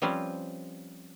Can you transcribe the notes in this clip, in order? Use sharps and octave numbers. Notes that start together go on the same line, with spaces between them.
F3 G3 C4 C#4 B4